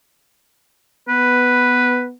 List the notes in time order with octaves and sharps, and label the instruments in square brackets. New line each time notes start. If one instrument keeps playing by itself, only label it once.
[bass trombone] B3 [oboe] B4